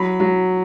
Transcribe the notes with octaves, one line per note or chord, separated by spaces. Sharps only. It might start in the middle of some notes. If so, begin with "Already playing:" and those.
Already playing: F#3 B5
F#3